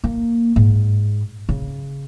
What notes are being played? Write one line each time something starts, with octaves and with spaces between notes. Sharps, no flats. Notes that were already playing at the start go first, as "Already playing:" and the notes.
A#3
G#2
C#3